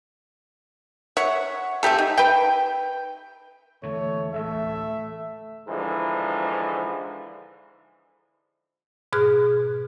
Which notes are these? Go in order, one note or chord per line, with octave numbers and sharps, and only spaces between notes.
C#5 E5 F#5
A3 C4 G4 A4
D#4
B4 G5
E2 D3 E3 A3 C#5
A1 D2 A3 E5
G#2 D3 E3 F3
G#2 B2 G#4 F6 F#6